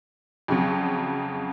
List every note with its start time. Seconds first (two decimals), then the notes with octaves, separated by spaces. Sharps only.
0.48 F2 C#3 F#3